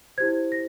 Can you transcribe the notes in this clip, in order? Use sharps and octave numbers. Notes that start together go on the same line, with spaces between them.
E4 G4 C5 G#6
A#6